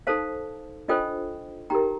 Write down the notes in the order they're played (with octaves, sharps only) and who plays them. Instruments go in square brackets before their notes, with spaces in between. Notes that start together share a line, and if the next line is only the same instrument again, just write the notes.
[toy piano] D#4 A4 C5 F5 A5
D4 F4 A4 C5 D#5 G5
D#4 G4 A#4 G5 A#5